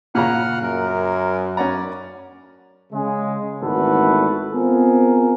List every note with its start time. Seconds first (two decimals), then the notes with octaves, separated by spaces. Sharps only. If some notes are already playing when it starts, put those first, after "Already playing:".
0.15 A#2 C#3 F#5 A#5 F6 F#6
0.63 F#2 A#4
1.57 C#4 D5 F#5 A#5
2.93 C#3 G#3
3.62 G#1 E2 A3 F#4 A4 B4
4.53 B3 C4 F4 G#4 A#4